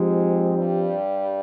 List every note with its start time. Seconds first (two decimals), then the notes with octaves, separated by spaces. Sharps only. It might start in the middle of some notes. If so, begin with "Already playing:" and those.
Already playing: G#2 F3 G#3 C4 G4
0.58 G2 G3